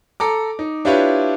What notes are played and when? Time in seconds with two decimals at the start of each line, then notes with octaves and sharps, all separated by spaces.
0.20 A4 A#5 D6
0.59 D#4
0.85 D4 E4 F4 G4 B4 C#5